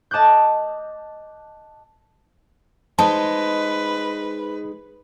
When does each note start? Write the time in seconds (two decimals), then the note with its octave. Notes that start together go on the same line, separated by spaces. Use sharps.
0.11 D#5 A5 D6 F#6 G6
2.99 G#3 D#4 B4 C5 D#5 A5